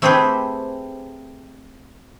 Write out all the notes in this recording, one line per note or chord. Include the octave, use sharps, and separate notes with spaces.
A3 C4 G4 G#4 B4 C5